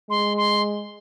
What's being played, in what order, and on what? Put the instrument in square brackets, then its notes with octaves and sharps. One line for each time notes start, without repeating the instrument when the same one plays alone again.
[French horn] G#3 [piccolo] C6
[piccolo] C6